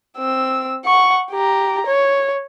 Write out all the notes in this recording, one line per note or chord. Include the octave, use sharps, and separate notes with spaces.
C4 E6
F#5 C#6
G4 A#5
C#5